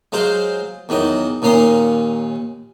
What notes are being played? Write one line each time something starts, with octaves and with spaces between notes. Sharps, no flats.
F#3 G#3 F4 C5
E2 D#3 F#3 D#5
D#2 A#2 C#4 A#5 C6 D#6